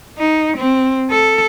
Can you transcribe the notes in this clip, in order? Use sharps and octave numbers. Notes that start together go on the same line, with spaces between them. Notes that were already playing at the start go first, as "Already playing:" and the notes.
D#4
C4
A4